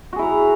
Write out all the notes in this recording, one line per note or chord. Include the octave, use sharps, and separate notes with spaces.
E4 F#4 G#4 A#5